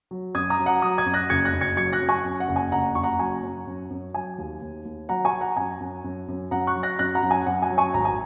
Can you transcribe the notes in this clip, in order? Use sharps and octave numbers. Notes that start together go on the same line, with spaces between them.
F#3
F#2 D#6 G#6
A#5 D#6
F#3
F#5 A#5
F#3 A#5 D#6
D#6 G#6
F#2
F#6 A#6
F#1 G#6 C#7
F#6 A#6
F#1
G#6 C#7
F#3 G#6 C#7
F#6 A#6
F#2
G#5 C#6
F#2
F#5
F#1
G#5
F#1 F#5 A#5
F#1 C#6
F#5 A#5
F#3 G#5
F#2
F#2
F#2
F#3 G#5
D#2
D#2
D#2
F#3 F#5 A#5
G#5 C#6
F#3
F#5 A#5
F#2 G#5
F#2
F#2
F#2
F#2 F#5 A#5
C#6 F#6
F#3
F#6 A#6
F#2 F#6 A#6
F#5 A#5
F#2
G#5
F#2 F#5
G#5
F#3
G#5 C#6
G#1 A#5
G#5